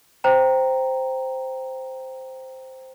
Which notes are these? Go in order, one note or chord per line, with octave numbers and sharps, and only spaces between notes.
C5 G5 A#5